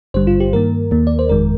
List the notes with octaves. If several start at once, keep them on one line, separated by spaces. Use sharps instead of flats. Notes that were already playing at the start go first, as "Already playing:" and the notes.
G#1 G2 D3 G3 C5
F4
G4
G2 D#3 A#3 A#4
D#2 D#3 A#3
D5
C5
G1 F2 D#3 G#3 A#4